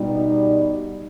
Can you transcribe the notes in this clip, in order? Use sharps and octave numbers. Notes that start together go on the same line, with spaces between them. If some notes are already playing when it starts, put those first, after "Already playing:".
Already playing: B2 G3 D#4